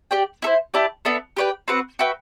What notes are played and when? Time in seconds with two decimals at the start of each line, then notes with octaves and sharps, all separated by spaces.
0.11 G4 D5 G5
0.42 E4 A4 C5
0.74 E4 G4 D5 A5
1.05 B3 D4 A4 E5
1.37 G4 B4 D5 G5
1.68 C4 F#4 B4 F#5
1.99 F#4 B4 E5 G5